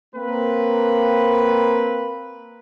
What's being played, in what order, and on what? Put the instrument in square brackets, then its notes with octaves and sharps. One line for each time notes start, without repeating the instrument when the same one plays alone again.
[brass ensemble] A#3 C4 B4